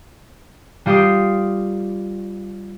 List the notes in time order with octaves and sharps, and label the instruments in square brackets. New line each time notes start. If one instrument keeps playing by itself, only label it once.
[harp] G3 F4 G4 D#6 C7